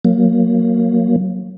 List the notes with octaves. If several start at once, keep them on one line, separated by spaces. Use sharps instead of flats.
F#3 A#3